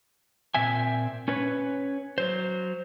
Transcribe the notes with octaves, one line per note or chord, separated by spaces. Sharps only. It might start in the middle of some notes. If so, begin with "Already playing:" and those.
A#2 C4 E5 G#5
C#4 B4 C#5
F#3 C5